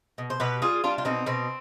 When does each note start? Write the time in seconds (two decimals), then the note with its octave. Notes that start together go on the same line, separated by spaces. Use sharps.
0.18 B2
0.30 C5
0.40 B2 G4 B4
0.62 G3 F4 G#4
0.84 G3 D4 F4
0.98 F4
1.05 B2 C4 D#4
1.26 B2 C4